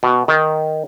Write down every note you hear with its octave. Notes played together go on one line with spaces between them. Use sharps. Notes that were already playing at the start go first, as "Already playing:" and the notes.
B2
D#3